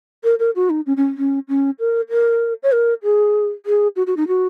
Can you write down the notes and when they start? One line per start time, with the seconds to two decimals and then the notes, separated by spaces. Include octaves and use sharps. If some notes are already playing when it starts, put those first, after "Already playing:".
0.24 A#4
0.39 A#4
0.56 F#4
0.70 D#4
0.86 C#4
0.97 C#4
1.17 C#4
1.49 C#4
1.79 A#4
2.10 A#4
2.63 C#5
2.72 A#4
3.03 G#4
3.66 G#4
3.96 F#4
4.07 F#4
4.17 D#4
4.28 F#4